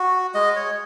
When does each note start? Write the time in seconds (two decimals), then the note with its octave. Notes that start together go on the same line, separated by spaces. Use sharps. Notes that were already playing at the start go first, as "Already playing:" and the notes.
Already playing: F#4
0.34 G#3 D#5
0.56 C#5